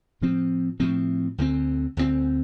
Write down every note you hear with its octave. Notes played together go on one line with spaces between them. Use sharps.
A2 F3 C4
A2 F3 C4
D2 D3 F3 C4
D2 D3 F3 C4